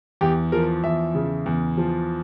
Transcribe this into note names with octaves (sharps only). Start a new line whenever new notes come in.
E2 G4
F3 A#4
E2 E5
C#3
E2
F3